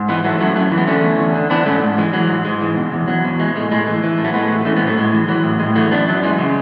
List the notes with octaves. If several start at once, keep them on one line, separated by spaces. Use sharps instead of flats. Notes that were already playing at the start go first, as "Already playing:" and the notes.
Already playing: G#2
E3 G#3 B3
E3 F#3 A3
F#2 F#3 A3
F#2 F#3 A3
E3
G#3 B3
D3 A3 C#4
E2
E2
D3
E3 B3 D4
G#2 A3 C#4
G#2
E3 G#3
E3 F#3
G#2
G#2 G#3
E3
B2
E2
E2 F#3
B2
E3 G#3
A2 G#3
A2 G#3
E3 G#3
E3
A2
F#3 A3
A2 G#3 B3
E3
E3 A3 C#4
G#3 B3
A2
F#3 A3
A2 G#3
E3
E3 F#3
A2
A2 G#3
E3 F#3 A3
F#2 B3 D4
F#2 F#3
E3 G#3
C#3